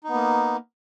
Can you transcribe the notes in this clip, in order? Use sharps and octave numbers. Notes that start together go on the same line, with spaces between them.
A#3 B3 D#4